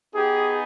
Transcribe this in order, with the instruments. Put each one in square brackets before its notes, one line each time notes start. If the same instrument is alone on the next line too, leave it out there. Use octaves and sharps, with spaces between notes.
[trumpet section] B3 D#4 G4 G#4